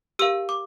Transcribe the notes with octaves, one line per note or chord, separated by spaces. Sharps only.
G4 A#4 F5 E6
D6